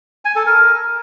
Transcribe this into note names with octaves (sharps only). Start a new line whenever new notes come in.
G#5
A4
A#4